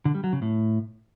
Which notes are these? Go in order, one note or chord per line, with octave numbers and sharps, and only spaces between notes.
D3
G3
F#3
C#3
A2